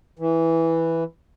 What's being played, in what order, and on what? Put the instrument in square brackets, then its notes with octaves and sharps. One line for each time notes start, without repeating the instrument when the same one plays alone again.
[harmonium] E3